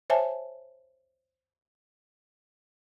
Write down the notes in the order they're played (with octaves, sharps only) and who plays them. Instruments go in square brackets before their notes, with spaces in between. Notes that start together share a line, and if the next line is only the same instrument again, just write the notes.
[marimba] C5 C#5 E5 G#5 A5